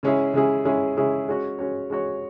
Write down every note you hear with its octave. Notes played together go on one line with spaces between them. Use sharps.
C#3 G#3 C#4 E4 G#4
C#3 G#3 C#4 E4 G#4
C#3 G#3 C#4 E4 G#4
C#3 G#3 C#4 E4 G#4
G#3 C#4 F#4 C#5
G#3 C#4 F#4 C#5
G#3 C#4 F#4 C#5